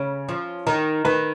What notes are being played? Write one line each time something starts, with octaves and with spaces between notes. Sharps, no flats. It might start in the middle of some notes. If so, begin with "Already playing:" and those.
Already playing: C#3 C#4
F3
D#3 A#4
D#3 B4